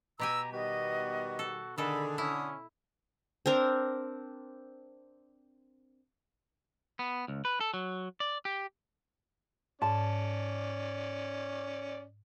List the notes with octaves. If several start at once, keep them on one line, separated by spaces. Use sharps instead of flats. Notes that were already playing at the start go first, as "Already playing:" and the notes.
B2 G4 G#5 A#5 E6
D#3 G3 B3 F#4 D#5
A4
D3 D#3 G#4 A4 B5
C#4 E4 D#6
C4 D4 A#4 A#5
B3
C#2
B4
A4
F#3
D5
G4
G#2 C#4 D5 A5